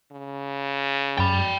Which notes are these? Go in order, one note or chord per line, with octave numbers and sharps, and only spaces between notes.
C#3
F#2 G5 B5 A6